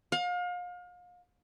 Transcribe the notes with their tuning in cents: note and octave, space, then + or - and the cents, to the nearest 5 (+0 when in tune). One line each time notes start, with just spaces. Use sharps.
F5 +35